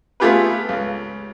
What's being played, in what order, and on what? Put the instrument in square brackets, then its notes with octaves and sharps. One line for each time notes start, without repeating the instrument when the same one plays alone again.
[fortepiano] A3 B3 F4 G4 G#4 B4
C#2